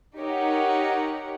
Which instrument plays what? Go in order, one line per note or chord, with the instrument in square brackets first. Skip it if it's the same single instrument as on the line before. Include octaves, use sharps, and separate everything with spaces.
[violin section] D#4 G4 A#4 C#5 F#5